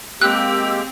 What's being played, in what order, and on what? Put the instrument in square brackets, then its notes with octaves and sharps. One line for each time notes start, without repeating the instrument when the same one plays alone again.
[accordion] G#3 A#3 G4 [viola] C4 [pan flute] E6 [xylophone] F#6